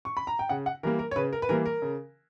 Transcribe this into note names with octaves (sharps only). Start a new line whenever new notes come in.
C#6
B5
A#5
G5
C#3 F#5
F#5
E3 G3 A#3 A#4
A#4
C#5
C#3 B4
A#4
B4
E3 G3 A#3 A#4
A#4
C#3